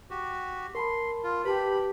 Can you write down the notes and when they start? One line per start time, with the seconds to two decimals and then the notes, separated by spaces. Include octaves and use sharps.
0.10 F#4 G4
0.75 A#4 A5 B5 C6
1.24 F4
1.45 G4 B4 A5 B5